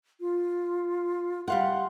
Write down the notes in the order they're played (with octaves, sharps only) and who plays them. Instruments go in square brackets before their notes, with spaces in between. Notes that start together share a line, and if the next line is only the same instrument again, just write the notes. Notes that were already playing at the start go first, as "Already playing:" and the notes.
[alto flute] F4
[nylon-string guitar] G3 F5 F#5 [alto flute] C6